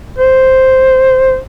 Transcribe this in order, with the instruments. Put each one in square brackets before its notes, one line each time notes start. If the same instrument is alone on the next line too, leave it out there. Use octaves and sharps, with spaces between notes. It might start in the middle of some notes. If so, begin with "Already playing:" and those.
[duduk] C5